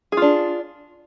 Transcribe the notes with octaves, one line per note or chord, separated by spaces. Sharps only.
D4 F4 G#4